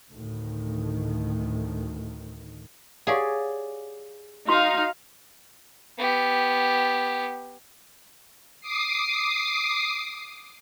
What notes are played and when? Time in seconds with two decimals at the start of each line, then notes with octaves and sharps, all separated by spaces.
0.12 D2 A2 D#3
3.07 G4 G#4 C#5 D5 F5 F#5
4.49 D#4 F#4 F5 C6
5.99 B3 G4
8.61 D6 D#6 C7